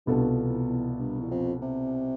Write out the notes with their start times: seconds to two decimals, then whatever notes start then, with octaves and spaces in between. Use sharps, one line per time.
0.06 C2 G2 B2 B3 F4 A4
0.37 E2
0.69 E2
0.99 G2
1.20 E2
1.31 F2
1.62 C3